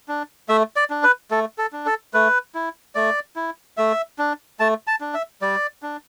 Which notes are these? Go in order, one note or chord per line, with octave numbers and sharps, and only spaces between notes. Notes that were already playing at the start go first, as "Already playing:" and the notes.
D4
A3 E5
D5
D4
B4
A3 A4
A4
D4
A4
A3 B4
E4
A3 D5
E4
A3 E5
D4
A3 A5
A5
D4
E5
G3 D5
D4